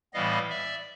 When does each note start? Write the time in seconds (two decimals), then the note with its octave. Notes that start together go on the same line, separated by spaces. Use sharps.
0.13 A2 E3 G3 B3 D#5 F5
0.50 D5 E5